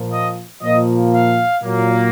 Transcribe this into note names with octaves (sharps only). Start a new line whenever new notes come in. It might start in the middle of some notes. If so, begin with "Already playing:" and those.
Already playing: A#2 F3 A#3
D#5
A#2 F3 A#3 D#5
F5
A#2 F#3 A#3